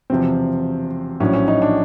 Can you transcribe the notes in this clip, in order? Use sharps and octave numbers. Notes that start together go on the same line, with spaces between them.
E1 E2 C3 F3 C4
A#1 A2 F#3 C#4
C#4
D#4
D4